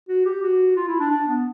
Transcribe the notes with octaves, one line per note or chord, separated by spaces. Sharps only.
F#4
G4
F#4
F4
E4
D4
D4
B3